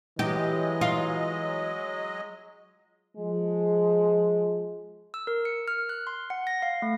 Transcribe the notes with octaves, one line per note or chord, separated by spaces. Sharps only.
E3 F#3 G#3 G4 D#5
F4
F3 G#3
E6
A#4
C#7
F6
F#6
C6
F#5
A#6
F5
A3